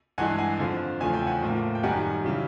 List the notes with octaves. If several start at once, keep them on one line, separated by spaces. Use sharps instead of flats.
G2 E3 G#3 F#5 G#5
F#5 G#5
F2 D3 F3
E2 C#3 F3 A3 G#5
G5
F#5 G#5
A2 F3 A#3
G5
F#2 D#3 G3 F#5 G#5
C#3 E3 G3